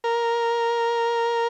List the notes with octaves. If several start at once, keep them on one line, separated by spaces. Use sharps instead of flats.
A#4